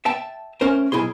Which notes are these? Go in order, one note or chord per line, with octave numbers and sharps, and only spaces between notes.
E5 G5 A5
A3 C#4 A#4 C5
B1 F3 E4 G#4 C6